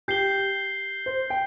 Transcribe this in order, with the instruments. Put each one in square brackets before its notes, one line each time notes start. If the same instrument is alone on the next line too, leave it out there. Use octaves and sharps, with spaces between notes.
[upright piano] G4 [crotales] G6 C7 G7
[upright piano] C5
G5